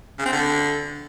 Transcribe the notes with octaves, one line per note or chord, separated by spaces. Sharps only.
C#3
C4
D3